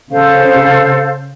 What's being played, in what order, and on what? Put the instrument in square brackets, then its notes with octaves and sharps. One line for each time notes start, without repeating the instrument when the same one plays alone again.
[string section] C#3 [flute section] A4 C5 F5